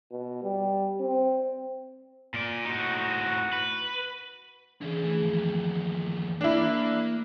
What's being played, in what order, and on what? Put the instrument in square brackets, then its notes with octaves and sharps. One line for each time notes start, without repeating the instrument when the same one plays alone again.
[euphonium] B2
G3
C4
[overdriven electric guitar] A#2 D5
[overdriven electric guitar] A2 D#4 [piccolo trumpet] F#4
[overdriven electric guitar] B4
[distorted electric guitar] C#3 D4 [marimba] E3 G#4
[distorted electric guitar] E3 [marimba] A3 G#4
[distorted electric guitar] D#2 F3
[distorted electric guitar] A#3 [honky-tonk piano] D4 E4